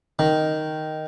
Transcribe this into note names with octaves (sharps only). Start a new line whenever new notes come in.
D#3